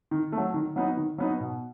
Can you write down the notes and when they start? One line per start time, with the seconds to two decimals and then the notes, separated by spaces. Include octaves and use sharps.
0.11 D#3
0.32 F#3 A3
0.54 D#3
0.76 F#3 B3 D#4
0.97 D#3
1.18 F#3 B3 D#4
1.40 B2